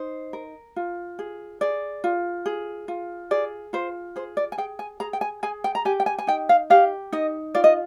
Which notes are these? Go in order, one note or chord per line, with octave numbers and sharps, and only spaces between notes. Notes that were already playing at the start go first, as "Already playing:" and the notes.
Already playing: D#4 C5
A#4
F4
G#4
G#4 D5
F4
G#4
F4
G#4 D5
F4 C5
G#4 C5
D5
G#5
G#4 G5
G#5
G#4 A#5
G5
G#5
G#4 G#5
G5
A#5
G4 G#5
G5
G#5
G#5
D#4 G5
F5
G4 F5
D#4 D#5
F4 D5
D#5